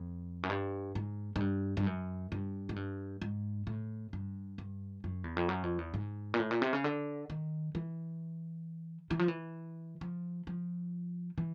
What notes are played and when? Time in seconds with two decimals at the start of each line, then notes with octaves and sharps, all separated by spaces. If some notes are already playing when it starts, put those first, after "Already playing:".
Already playing: F2
0.43 F#2
0.50 G2
0.95 G#2
1.36 G#2
1.40 G2
1.77 G2
1.87 F#2
2.32 G2
2.69 G#2
2.76 G2
3.22 G#2
3.67 A2
4.13 G2
4.58 G2
5.04 F#2
5.24 E2
5.37 F2
5.49 F#2
5.63 F2
5.78 E2
5.94 G#2
6.34 A#2
6.40 A2
6.51 A#2
6.62 C3
6.73 C#3
6.84 D3
7.30 D#3
7.75 E3
9.11 E3
9.19 F3
9.28 E3
10.01 F3
10.47 F3
11.38 E3